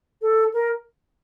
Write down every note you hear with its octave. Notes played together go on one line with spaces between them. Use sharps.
A4
A#4